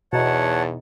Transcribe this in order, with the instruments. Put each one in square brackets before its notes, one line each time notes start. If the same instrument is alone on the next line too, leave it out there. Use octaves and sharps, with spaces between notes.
[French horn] E2 [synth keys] B2 D#4 [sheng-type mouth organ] C#5 F#5 A5